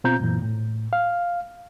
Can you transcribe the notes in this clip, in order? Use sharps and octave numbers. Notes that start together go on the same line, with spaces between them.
B2 C4 F4 A#5 G6
F#2 A#2 E3
A2
F5